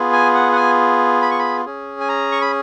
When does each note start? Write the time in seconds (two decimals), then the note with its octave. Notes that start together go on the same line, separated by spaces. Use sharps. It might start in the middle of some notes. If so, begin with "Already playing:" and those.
Already playing: B3 F4 G#4
0.13 G#5
0.35 F#5
0.52 F#5
0.56 G#5
1.22 B5
1.31 C#6
1.39 B5
1.65 C#4 G#4
2.01 G#5
2.09 A#5
2.32 C#6
2.42 B5